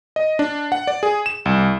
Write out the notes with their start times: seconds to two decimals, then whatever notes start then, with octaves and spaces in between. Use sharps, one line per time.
0.16 D#5
0.39 D4
0.72 F#5
0.87 D5
1.03 G#4
1.26 E7
1.46 C2